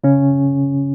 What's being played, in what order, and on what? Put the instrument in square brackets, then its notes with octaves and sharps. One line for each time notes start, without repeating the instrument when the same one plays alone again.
[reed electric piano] C#3 C#4